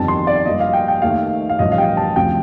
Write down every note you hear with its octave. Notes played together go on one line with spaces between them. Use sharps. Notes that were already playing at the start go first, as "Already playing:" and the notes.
Already playing: G1 F2 D#3 G3 A5
C6
D5
G2 F3 A#3 D#5
F5
G5
G5
D#2 D#3 A3 F5
F5
A1 G2 F3 D#5
F5
G5
A5
D2 C3 F3 G5